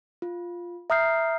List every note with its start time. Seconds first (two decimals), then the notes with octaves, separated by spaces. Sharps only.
0.22 F4
0.90 E5 A#5 D#6 F6 G6 C7